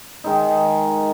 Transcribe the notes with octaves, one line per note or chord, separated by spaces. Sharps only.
D#3 G#3 D#4